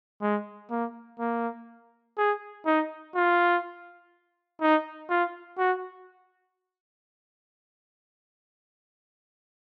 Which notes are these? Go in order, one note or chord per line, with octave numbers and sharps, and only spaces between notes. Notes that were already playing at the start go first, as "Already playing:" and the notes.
G#3
A#3
A#3
G#4
D#4
F4
D#4
F4
F#4